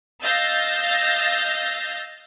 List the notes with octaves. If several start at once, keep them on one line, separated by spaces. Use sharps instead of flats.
D#5 F5 E6 G6 A6 A#6